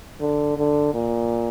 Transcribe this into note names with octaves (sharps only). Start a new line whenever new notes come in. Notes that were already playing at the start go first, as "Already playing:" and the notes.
D3
D3
A#2